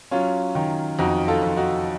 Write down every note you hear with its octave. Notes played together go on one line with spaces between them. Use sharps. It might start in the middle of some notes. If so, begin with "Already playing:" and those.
F#3 C#4 F4
D#3
F2 D#4 F#4
F4 A4
F2
D#4 F#4